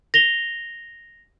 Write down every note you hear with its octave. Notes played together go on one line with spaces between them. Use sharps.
A#6 F7 G7